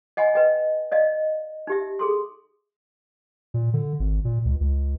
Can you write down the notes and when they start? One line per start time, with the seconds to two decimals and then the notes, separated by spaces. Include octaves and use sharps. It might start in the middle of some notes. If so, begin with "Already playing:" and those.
0.17 D#5 F#5 G#5 B5
0.34 B4 D#5 G5
0.92 D5 D#5 F5
1.67 D#4 G4 E5
1.99 G#4 A4 C6
3.54 A#2
3.73 D3
4.00 G#1
4.25 A#2
4.45 C#2
4.61 C#2